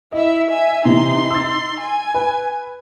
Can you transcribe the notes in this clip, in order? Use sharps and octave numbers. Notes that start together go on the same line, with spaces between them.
E4 D#5 E5
E5 G#5
C3 E3 D#4 C6
E6 A6
G#5
B4